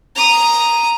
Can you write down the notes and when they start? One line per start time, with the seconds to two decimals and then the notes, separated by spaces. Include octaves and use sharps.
0.16 A#5 D#6